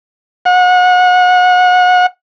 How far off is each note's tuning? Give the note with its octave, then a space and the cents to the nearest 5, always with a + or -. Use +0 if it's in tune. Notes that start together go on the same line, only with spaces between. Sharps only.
F#5 -30